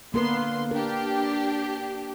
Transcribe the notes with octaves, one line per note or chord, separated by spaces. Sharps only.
D3 A#3 B3 A#4 B4 C6
D4 G4 A#4